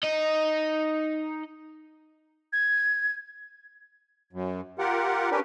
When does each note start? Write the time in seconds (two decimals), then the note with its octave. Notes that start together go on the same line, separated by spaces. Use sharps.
0.04 D#4 D#5
2.53 G#6
4.33 F#2
4.79 F4 G4 A#4 F#5
5.31 C#4 D4 G4 A#4 B4